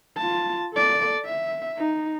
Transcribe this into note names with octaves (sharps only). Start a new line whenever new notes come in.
F4 A5
A4 D5
E5
D#4